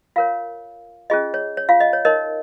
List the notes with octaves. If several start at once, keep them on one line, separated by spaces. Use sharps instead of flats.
F4 A#4 C#5 F5
C#4 F4 G#4 D#5
C#5
C#5
F4 F5
D#5
C#5
D#4 A#4 C#5 D#5